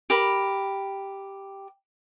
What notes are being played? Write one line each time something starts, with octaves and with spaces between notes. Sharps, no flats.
G4 A#4 B5